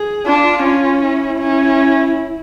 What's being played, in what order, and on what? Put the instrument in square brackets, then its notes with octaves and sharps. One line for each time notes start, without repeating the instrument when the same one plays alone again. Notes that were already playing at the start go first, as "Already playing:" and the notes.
Already playing: [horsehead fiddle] G#4
[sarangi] D4 [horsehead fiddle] F4
[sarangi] C#4
[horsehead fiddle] E4
[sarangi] C#4